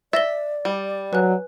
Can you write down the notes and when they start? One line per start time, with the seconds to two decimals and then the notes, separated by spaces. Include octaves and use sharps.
0.13 D5 E5 A6 A#6 G7
0.65 G3
1.13 F#3 B4 G#5 F#6